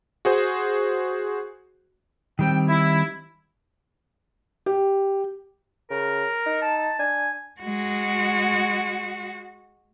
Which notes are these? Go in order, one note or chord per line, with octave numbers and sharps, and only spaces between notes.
F#4 G#4 C5
D#3 G3 C4 G5
E4
G4
C#3 A#4
D#4
A5
A5
D4 G#5
G#3 F#4